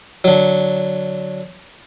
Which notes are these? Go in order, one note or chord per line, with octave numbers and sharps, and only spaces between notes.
D3 F#3